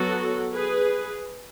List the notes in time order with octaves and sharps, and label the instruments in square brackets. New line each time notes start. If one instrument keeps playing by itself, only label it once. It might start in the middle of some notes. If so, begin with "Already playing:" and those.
Already playing: [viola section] F#3 B3 F#4 A4
G#4 B4